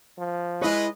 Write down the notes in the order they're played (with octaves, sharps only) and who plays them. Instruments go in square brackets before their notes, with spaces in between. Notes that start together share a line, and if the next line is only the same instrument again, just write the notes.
[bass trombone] F3
[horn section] G#3 B4 D#5 [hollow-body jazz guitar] E4 C#5